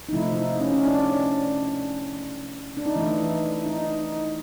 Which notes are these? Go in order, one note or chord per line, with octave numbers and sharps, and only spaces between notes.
D#4
C3 F3 A3 E4
D#4
C#4
C#4
D4
D4
D#4
E3 A3 E4
D#4